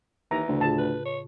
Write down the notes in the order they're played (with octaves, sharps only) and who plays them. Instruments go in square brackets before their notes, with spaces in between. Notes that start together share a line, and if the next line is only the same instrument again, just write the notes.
[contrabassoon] D#2 [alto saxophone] E3 [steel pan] A#5
[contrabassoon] D2 [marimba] C#3
[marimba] A2 F4 G#4 [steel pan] A5
[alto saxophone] B4
C#5